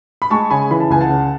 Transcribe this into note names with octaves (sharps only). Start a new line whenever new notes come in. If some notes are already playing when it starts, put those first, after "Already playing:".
B5
G#3 A5 C#6
C#3 G#5 B5
E3 B5
A5
C#2 G#5
F#5 A5
C#3